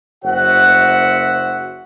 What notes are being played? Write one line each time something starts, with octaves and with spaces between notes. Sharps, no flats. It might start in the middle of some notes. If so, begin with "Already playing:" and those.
F#1 F#4 C5 E5 F#5